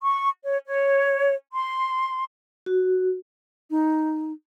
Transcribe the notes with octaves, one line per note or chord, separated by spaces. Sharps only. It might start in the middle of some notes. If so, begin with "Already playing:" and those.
C#6
C#5
C#5
C6
F#4
D#4